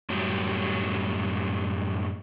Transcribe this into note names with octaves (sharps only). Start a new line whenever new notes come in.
F#2 A2 F#3 G3